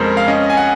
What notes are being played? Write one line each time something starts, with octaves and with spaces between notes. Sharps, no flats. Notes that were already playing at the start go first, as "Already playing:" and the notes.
Already playing: F2 C#3 G#3 A#4 C5
F5
C#4 D#5
G#5
F#5